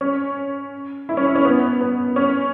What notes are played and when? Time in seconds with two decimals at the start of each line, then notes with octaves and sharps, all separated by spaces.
0.01 C#4
1.09 E4
1.17 C#4
1.27 E4
1.35 C#4
1.45 B3
1.81 B3
2.16 C#4